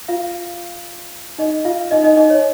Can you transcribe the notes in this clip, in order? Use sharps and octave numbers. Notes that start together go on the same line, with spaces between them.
F4 F5
D#4 D#5
F4 F5
D#4 D#5
D#4 D#5
D#4 D#5
C#5